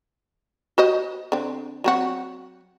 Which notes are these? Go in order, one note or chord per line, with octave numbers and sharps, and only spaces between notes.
F#4 C5 D#5
D3 C4
F#3 C4 F#4